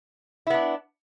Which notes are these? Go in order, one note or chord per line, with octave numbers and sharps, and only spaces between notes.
B3 D4 E4